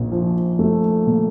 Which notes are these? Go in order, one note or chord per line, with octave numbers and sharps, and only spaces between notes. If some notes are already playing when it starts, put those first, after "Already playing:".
Already playing: A#1 A#2
F3
A3
A#2